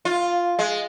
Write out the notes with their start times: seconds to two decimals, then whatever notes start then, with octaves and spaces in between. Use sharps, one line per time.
0.05 F4
0.59 G#3